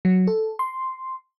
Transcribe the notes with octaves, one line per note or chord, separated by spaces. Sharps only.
F#3
A4
C6